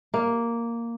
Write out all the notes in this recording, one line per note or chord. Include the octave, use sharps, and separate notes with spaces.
A#3